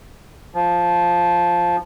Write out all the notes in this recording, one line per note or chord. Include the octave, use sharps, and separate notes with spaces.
F3